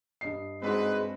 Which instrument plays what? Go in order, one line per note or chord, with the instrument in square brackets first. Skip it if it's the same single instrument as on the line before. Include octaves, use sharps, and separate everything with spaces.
[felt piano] G2 D#5 C7
[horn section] G#2 B4 [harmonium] G#3 [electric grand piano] C4 D4 F#4